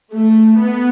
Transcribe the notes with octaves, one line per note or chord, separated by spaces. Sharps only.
A3
B3